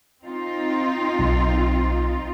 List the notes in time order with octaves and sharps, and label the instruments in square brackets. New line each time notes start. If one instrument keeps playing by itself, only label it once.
[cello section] C4 D#4 F4
[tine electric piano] B1